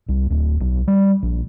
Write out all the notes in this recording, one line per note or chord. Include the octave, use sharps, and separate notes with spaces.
C2
D1
B1
G3
A#1